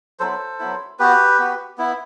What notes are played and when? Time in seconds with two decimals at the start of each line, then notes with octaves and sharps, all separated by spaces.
0.19 F#3 B3 E4 A4 C5
0.59 F#3 B3 E4
0.99 B3 F#4 G4 B4
1.39 B3 F#4
1.78 B3 E4